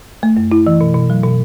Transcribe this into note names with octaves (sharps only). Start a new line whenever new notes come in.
A3
F#2
E4
E3
B2
B2
F#3
B2